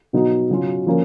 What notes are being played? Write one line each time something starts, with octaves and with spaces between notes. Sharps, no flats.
B2 F#3 B3 D#4 F#4
C#3 F#3 C#4 F4
F3 A#3 C#4